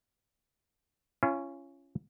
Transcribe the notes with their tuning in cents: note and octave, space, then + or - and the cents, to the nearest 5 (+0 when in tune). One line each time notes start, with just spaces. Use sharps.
C#4 +0 F4 -35